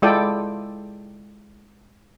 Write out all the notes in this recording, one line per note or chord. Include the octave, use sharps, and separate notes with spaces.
G#3 E4 F4 A4 D5 G5